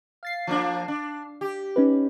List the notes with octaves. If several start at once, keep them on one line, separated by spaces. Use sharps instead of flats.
F5 A6 C7
F3 A#3 D4
D4
G4
C#4 D#4 B4